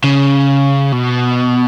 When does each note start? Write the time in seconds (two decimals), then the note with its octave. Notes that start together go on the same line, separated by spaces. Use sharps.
0.04 C#3
0.92 B2